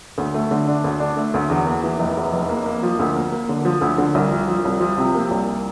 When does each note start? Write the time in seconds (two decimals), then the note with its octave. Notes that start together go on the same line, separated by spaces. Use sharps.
0.18 D2
0.34 A3
0.51 D3
0.67 D4
0.84 D2
1.00 D4
1.17 A3
1.34 D2
1.50 E2
1.66 A#3
1.83 E3
1.99 F1
2.17 E2
2.33 F1
2.49 A#3
2.66 A#3
2.83 F3
2.99 D2
3.15 A#3
3.32 A#3
3.49 D3
3.65 F3
3.81 D2
3.98 D3
4.15 C2
4.31 F3
4.48 F3
4.65 C2
4.81 F3
4.98 C3
5.14 A#3
5.31 C2